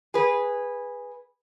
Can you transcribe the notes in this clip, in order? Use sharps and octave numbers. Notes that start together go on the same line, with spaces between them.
G#4 B4